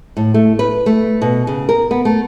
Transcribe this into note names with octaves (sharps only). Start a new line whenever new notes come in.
A2
A3
B4
A3
B2
C#3
A#4
B3
A3